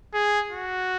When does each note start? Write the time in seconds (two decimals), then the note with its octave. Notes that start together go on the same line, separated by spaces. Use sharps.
0.14 G#4
0.51 F#4